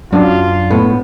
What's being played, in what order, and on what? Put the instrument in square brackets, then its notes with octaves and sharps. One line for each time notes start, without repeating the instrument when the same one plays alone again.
[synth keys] F#2 [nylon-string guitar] D4 [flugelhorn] F4
[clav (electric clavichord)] A2 [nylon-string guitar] B3